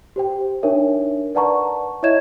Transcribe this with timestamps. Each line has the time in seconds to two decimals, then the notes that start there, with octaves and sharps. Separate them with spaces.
0.16 G4 C5 G5
0.63 D4 D#4 A#4 C#5 E5
1.35 B4 D5 F#5 A5 A#5 C#6
2.03 E4 C#5 D#5 E5 G#6 E7